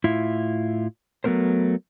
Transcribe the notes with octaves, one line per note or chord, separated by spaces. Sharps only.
A2 E4 F4 E5
F#3 A3 B3 A#4 C5